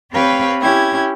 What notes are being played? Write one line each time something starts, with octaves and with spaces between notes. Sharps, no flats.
C4 G4 B4 C#5 F5 G5
C#4 E4 G4 G#6